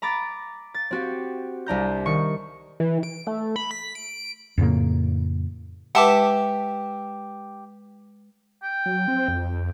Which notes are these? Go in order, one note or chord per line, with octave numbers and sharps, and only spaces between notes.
A#5 B5 D6 A6
A6
C4 F#4 G4
C2 D4 A#5 G6
D#3 C#6 C#7
E3
D7
A3
B5
B6
D7
F2 A2 C#3 A#3
G#3 G4 B4 E5 F#5 A5 C6 D6
G5
F#3
C4
F2